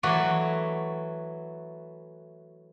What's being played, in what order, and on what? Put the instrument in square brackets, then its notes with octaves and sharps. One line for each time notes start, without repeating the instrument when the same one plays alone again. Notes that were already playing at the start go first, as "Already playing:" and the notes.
[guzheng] E3 F#3 A3 F#4 D5